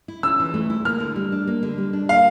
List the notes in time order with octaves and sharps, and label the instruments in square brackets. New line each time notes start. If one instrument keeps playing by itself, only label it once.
[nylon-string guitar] E4
[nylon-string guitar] C#4 [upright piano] E6
[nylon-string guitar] E3
A3
E4
[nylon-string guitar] A#3 [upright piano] F6
[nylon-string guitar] D3
G3
D4
A#3
D3
G3
D4
[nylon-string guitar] A#3 [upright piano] F5